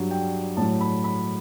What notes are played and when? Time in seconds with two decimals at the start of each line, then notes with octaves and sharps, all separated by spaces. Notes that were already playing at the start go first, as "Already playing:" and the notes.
Already playing: G2 F#3
0.11 G5
0.57 A2 F#3 A5
0.81 B5
1.04 B5